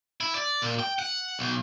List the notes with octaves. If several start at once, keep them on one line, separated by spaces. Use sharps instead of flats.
E4
D5
A#2
G5
F#5
B1